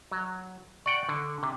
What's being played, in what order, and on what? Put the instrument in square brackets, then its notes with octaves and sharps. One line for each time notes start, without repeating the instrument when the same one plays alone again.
[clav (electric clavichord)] F#3
[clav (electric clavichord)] D5 F#5 G5 [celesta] C#6
[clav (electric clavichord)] D3
[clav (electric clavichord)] C3 [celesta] D6